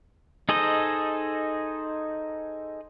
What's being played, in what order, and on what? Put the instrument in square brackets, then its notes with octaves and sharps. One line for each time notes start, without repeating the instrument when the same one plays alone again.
[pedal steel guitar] D#4 G#4 A4 C5 D#5